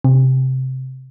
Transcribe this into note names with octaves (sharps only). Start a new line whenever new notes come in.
C3